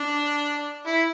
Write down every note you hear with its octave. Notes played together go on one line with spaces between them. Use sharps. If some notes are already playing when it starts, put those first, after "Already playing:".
Already playing: D4
E4